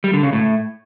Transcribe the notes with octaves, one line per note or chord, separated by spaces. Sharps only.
G3
D3
C#3
A2